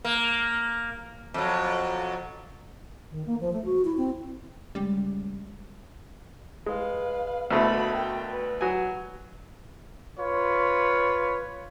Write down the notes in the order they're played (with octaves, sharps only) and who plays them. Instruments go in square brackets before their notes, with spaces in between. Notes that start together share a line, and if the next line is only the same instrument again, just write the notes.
[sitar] A#3
F2 F#3
[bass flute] D#3
A#3
F3
A3
F#4
E4
C4
[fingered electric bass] F#1 G#3 C#4 [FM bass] G3
[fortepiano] G#3 [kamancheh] B4 F5
[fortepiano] D2 B2 A3 [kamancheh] A#3 B5
[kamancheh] A#4 G5
B4
[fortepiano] F#3 G#5
[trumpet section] F4 B4 C#5